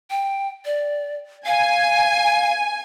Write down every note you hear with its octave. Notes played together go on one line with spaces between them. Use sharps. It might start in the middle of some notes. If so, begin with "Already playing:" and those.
G5
D5
F5 G#5